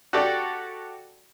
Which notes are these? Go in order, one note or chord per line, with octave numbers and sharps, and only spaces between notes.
F#4 G4 A4 D5